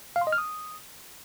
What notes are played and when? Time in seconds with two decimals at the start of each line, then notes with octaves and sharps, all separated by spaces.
0.16 F5
0.21 C6
0.27 D#5
0.32 F6
0.38 D#6